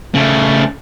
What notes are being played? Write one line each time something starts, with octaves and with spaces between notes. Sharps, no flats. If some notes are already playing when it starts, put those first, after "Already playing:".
C#3 A3